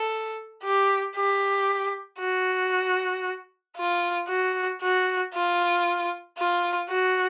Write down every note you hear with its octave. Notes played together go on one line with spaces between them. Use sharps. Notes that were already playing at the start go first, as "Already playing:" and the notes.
Already playing: A4
G4
G4
F#4
F4
F#4
F#4
F4
F4
F#4